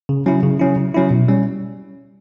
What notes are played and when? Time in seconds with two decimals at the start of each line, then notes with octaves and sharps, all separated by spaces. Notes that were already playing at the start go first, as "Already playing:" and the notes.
0.09 C#3
0.26 F#3 C#4 E4
0.43 C#3
0.60 F#3 C#4 E4
0.76 C#3
0.94 F#3 C#4 E4
1.11 B2
1.28 G3 C#4